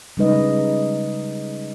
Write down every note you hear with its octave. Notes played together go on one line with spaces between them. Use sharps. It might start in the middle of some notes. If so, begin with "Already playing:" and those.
C#3 G3 G#3 D#4 B4 D#5